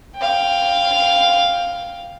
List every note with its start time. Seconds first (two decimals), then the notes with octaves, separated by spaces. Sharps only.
0.17 F5 G5